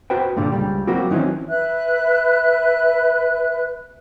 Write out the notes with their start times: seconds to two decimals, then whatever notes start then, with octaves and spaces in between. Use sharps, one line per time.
0.10 F#4 B4 C5 G5
0.36 G2 A#2 D3 G3
0.52 C#2 F#2 G3
0.87 F#3 G3 A#3 C4 F#4 G4
1.11 D#3 E3 F#3 C4 C#4
1.48 B4 E5 F#6